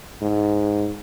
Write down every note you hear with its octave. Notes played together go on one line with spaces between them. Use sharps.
G#2